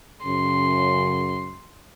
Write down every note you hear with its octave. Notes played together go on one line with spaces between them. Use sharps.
F#2 C#3 C6